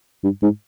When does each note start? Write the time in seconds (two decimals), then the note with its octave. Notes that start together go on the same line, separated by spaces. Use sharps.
0.24 G2
0.42 G#2